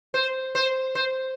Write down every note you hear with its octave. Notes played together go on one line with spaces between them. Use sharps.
C5
C5
C5